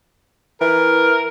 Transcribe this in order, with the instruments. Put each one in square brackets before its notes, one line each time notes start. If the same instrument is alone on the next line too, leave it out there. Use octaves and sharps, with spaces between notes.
[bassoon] E3 [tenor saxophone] A#4